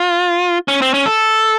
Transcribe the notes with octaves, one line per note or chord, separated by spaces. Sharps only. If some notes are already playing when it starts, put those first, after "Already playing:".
Already playing: F4
C#4
C4
C#4
A4